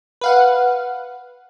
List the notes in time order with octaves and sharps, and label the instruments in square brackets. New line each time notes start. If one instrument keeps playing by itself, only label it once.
[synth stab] B4 F5 F#5